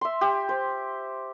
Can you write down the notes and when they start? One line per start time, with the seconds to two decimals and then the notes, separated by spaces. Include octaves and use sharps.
0.01 E5 C6
0.21 G4
0.49 C5